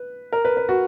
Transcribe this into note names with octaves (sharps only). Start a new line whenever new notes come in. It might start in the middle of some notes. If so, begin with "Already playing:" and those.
Already playing: B4
A#4
B4
B4
F#4